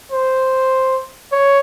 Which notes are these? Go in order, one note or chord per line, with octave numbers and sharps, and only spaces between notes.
C5
C#5